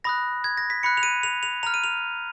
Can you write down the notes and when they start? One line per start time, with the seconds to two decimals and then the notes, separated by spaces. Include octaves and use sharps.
0.04 B5 D#6 F#6 A#6
0.44 G#6
0.57 A#6
0.70 B6
0.83 B5 F#6 C#7
0.97 F7
1.03 D#7
1.23 F7
1.43 F7
1.63 A#5 F6 F7
1.74 D#7
1.84 F7